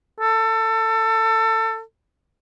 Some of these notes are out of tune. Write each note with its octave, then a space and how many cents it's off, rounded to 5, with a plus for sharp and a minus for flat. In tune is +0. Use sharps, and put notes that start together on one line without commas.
A4 +25